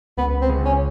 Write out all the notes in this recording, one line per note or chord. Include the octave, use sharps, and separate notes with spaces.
C#2 B3
C4
C#3
C#4